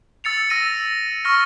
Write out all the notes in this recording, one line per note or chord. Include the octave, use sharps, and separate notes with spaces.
E6 A6 C#7 F7
E6 A#6 D#7
C#6 F6 A#6